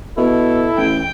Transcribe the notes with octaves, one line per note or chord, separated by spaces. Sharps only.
B2 E4 A4
A1 G5